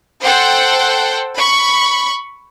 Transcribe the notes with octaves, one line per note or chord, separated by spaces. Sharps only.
A4 C5 F#5 G5
B5 C#6